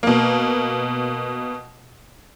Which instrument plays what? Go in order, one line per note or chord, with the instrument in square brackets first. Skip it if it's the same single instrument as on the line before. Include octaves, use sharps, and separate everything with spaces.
[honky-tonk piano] B2 A#3